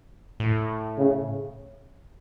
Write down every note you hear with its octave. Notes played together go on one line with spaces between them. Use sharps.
A2
C#3